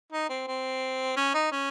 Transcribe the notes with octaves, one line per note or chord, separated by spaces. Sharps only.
D#4
C4
C4
C#4
D#4
C#4